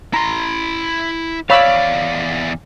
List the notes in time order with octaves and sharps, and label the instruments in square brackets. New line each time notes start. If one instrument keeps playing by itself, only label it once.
[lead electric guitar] E4 C6 [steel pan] A#5
[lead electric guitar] E2 D5 [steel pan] C#5 B5 E6 [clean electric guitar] F5